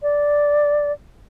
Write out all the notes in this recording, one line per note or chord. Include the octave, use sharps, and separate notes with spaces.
D5